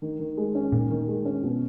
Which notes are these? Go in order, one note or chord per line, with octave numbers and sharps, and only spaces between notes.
D#3
D#3
G#3
C#4
A#2 D#3
D#3
G#3
C#4
B2